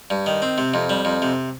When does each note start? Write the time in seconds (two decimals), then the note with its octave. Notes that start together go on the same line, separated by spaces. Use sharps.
0.10 G2
0.26 D#3
0.42 C4
0.58 C3
0.74 F2
0.89 G3
1.05 F2
1.22 C3